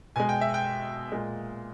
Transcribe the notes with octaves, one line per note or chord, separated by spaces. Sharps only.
B2 G#3 G#5
G5
E5
G5
A#2 G#3